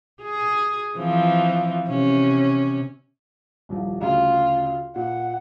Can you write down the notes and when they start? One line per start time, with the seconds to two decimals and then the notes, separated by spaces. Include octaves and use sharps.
0.22 G#4
0.98 E3 F3 C4
1.88 C3 C#4
3.69 D#1 C2 F3
4.01 D2 C#3 F4
4.96 A#2 F#5